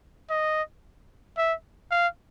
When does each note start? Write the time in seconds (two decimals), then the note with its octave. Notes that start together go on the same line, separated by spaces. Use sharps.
0.30 D#5
1.37 E5
1.91 F5